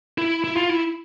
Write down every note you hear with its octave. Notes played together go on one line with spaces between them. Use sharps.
E4
E4
F4
E4